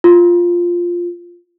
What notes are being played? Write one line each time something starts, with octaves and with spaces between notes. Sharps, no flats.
F4